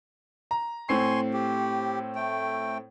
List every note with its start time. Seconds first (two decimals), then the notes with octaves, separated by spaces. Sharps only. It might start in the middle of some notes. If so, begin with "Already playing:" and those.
0.51 A#5
0.89 A2 C4 G#5 C6 C#6 C7
1.33 G4
2.16 A3 G5